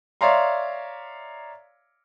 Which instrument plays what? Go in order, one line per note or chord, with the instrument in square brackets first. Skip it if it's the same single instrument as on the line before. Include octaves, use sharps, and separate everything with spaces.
[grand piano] C#5 D5 E5 F5 A#5 C6